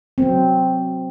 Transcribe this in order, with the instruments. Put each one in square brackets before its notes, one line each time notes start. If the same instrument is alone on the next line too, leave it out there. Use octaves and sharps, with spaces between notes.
[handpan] F#3 C4